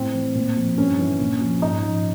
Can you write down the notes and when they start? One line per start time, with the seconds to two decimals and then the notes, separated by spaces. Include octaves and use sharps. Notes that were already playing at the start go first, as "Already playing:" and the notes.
Already playing: A2 C4
0.14 E3
0.35 A#2
0.56 F3
0.78 G2 C#4
0.99 E3
1.20 A#2
1.41 F3
1.62 G#2 D#4
1.83 F3